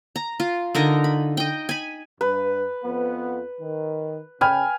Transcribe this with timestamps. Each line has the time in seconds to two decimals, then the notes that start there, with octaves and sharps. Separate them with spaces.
0.16 A#5
0.40 F4
0.75 D3 D#4 A#4 A#5
1.04 B5
1.37 D#5 G5
1.69 G#5 B5
2.21 G2 B4
2.84 F2 F3 B3
3.60 D#3
4.41 C#3 G5 G#5 B5 F6